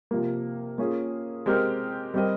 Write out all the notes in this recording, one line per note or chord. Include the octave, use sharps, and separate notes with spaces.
C3 F3 A#3
A#3 C#4 F4 G#4
G#3 C4 G4 A#4
G3 C4 G4 A#4 D#5